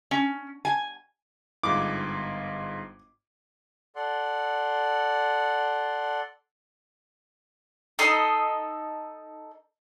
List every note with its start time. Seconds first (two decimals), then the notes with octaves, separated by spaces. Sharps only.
0.11 C#4
0.65 G#5
1.63 G1 G#2 F4 D6
3.96 A4 D5 F#5 C6
7.99 D#4 A4 D#5 C6